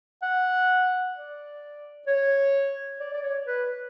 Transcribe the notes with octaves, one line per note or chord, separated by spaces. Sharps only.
F#5
D5
C#5
D5
D5
C#5
B4